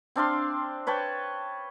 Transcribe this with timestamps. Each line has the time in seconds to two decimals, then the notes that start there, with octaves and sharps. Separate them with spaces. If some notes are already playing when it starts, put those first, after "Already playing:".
0.16 C4 D4 F5 C6
0.87 B4 C#5 G5 A5